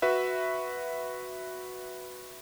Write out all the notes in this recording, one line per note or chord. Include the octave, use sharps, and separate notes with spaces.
F#4 B4 E5